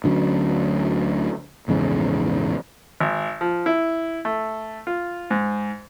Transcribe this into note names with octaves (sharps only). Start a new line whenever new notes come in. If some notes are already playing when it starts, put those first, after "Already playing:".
D2 D3 F#3 C#4
A#1 E2 G#2 C#3
G#1
F3
E4
A3
F4
G#2